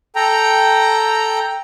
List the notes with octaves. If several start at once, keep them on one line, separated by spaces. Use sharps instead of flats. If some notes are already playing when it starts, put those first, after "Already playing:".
A4 G5 A#5